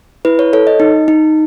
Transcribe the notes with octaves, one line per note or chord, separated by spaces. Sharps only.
E4 B4
C#5
A4 C#5
D#5
D#4
D#4